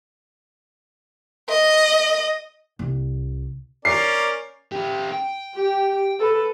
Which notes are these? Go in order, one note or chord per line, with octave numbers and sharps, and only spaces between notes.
D#5
C2
C#4 A#4 D5 C7
C#4 G4
G5
G4
A4 B4